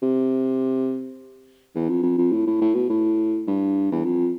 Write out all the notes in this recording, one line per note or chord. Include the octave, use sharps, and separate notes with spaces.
C3
E2
F2
F2
F2
A2
A2
A2
B2
A2
G2
E2
F2